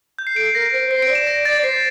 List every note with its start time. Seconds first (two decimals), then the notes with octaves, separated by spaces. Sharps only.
0.19 G6
0.27 C7
0.36 A4 D7
0.46 C7
0.54 A#4 A#6
0.73 C5
0.91 C5 C7
1.02 D7
1.09 D5
1.15 E7
1.27 A#6
1.45 A6
1.63 C5 C7